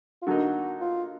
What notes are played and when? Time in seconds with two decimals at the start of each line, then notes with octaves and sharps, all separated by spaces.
0.22 F4
0.27 D3 F#3 A#3 D#4 F#4
0.81 F4